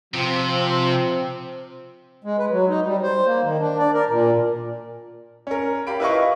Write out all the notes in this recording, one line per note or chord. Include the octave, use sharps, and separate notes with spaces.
C3 F3 C4
G#3
B4
F#3
D#4
G3
C5
A#3
D#3
D4
D5
A#4
A#2
C#4 A#4
G4 F5 B5 D7
E4 F4 B4 D#5 F5 C#6